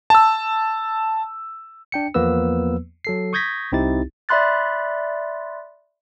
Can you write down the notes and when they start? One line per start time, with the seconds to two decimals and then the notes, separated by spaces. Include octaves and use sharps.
0.10 A5 E6
1.92 D4 G5 C#7
2.14 E2 F3 A#3 B3 B4 E6
3.05 F#3 A4 C7
3.33 C#6 D#6 G6 G#6 A#6 B6
3.72 C2 C4 D#4 E4 G4 A6
4.29 D5 E5 B5 C6 F#6 A6